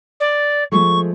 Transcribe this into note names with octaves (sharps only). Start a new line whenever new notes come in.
D5
F3 G#3 A3 C#6